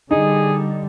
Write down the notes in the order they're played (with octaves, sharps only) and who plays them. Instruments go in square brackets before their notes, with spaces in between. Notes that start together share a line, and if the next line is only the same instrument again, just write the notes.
[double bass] D3 G3 [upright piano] D#4 [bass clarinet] G#4